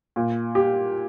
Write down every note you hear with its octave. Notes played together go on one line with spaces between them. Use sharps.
A#2
G4